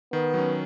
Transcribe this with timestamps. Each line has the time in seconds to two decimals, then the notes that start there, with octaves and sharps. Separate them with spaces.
0.13 D#3 B3
0.34 F#3 C#4